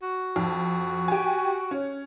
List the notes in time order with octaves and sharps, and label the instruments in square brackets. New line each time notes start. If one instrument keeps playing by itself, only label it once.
[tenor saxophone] F#4
[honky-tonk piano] F2
G4 G#5
C#4